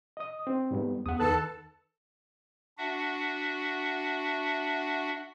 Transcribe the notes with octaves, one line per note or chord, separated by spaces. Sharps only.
D#5 D#6
C4
G#2 G3 B3
E2 F#5 D#6
D#3 A4 B4 A5 F#6
D4 F#4 E5 F#5